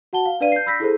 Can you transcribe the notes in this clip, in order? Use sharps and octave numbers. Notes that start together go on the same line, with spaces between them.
F#4 F#5 A5 G7
F5
D4 B4 D5 F5 D#7
G6 C7
B5 E6 G6 A#6 B6
E4 G#4 A4 C5